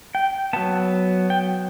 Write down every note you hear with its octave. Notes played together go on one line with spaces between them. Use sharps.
G5
F#3 B3 A5
G5